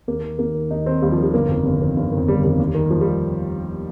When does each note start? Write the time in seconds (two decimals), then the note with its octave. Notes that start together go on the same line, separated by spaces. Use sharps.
0.08 D#2 A#3
0.23 D#3
0.39 D#2 A#3
0.55 D#3
0.70 D#2 D#4
0.86 D#3 C4
1.02 D#2 G3
1.12 F3
1.18 D#3
1.23 G3
1.34 G1 A#3
1.49 F2 D#3
1.65 G1
1.80 F2 D#3
1.96 G1
2.12 F2 D#3
2.28 G1 G3
2.44 F2 D#3 G3
2.59 D#2
2.75 D#3
2.91 D#2 F3
3.01 G3